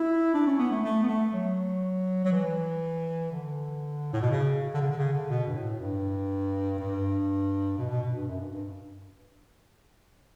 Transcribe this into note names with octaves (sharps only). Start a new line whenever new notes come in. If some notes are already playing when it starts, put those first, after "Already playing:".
Already playing: E4
D4
C#4
B3
A3
A3
B3
A3
F#3
F#3
E3
D3
A2
B2
C#3
D3
C#3
D3
C#3
D3
B2
G2
A2
G2
G2
B2
B2
B2
G2
F#2
G2
G2